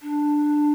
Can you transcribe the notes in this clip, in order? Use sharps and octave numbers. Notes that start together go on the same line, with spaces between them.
D4